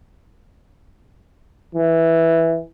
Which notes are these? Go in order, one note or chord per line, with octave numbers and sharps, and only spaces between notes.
E3